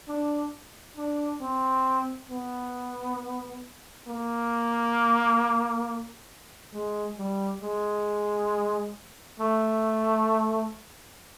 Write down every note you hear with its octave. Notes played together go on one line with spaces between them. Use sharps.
D4
D4
C4
B3
A#3
G#3
G3
G#3
A3